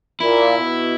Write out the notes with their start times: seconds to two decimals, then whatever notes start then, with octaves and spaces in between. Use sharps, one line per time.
0.20 A#2 E4
0.58 B2